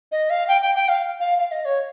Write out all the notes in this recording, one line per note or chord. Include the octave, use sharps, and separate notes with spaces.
D#5
F5
G5
G5
G5
F5
F5
F5
D#5
C#5